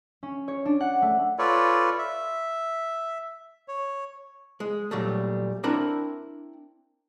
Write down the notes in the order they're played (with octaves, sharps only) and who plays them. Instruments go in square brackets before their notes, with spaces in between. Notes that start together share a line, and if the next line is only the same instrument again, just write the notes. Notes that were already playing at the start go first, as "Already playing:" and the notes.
[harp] C#4
C#5
D4
F#5
A3
[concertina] F4 A4 B4 C#5 D5
E5
C#5
[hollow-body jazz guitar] G#3
A#2 F#3 G3 A3
C4 D4 E4 A#4 B5